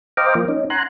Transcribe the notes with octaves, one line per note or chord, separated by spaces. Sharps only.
C5 D#5 F5 G5 A#5 D6
F3 A#3
C#4 D#4
F#5 G#5 A#5 C6 F#6